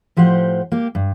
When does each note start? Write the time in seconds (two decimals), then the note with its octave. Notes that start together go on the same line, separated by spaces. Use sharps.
0.17 A2 F3 G4 C5 F#5
0.72 A#3 G4
0.95 G2